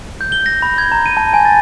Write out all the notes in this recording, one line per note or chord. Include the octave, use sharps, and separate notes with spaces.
G6
G7
A#6
B5
G#6
A#5
D#7
A5
G#5
A6